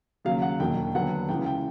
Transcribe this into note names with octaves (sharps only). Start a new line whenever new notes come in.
D#2 C#3 F#3 F5
F#5
E1 D#2 D3 F#3 G5
D#2 D3 F#3 B3 F#5
C#2 C#3 E3 G5
G5